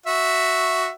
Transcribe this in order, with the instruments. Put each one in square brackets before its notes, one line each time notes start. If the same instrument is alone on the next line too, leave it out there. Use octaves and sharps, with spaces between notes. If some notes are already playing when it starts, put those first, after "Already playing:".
[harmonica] F#4 E5